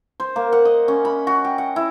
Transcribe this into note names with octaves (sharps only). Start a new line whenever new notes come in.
C5
A#3
F#5
D#5
C#4
B5
F#4
G5
F#5
E4